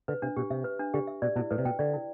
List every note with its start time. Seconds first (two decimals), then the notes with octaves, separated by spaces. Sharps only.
0.08 D3 B4
0.22 C3 D4
0.36 B2 G4
0.50 C3 E5
0.64 B4
0.79 D4
0.94 D3 G4
1.07 E5
1.22 B2 D5
1.36 B2 E4
1.51 A2 B4
1.58 C3
1.65 B2 G5
1.79 D3 D5
1.93 E4